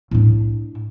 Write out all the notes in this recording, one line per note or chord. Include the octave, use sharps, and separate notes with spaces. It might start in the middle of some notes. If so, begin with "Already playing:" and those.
A2 D4